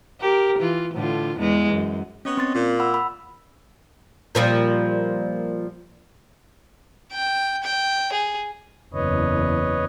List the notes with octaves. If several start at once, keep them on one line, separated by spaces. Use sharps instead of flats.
G4 A#4
E3 F4
A2 D3 F4
E2 E3 G#3
F#2
B3 C#4 C#5 D#5
C4 C6 A6
A#2
F#5 B5 E6
B5
A#2 F3 G3
G5
G5
G#4
F#1 E2 B4 C#5 D#5